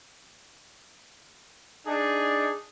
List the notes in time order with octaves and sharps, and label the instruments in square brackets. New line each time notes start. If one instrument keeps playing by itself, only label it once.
[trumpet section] D4 D#4 G#4